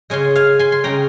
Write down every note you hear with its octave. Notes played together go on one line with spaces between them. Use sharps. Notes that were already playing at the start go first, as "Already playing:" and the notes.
C#3 G#3 C#4 G#5 C6
F5 G#5
G#5 C6
C6
C#3 G#3 C#4 G5 A#5